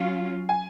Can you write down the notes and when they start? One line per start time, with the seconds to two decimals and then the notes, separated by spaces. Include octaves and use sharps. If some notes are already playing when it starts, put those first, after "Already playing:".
Already playing: F#3 C#4 F4 F5
0.49 G#5